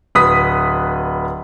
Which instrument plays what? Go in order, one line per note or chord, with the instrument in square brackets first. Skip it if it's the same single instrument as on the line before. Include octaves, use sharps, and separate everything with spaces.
[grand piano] D1 B4 D#6 B6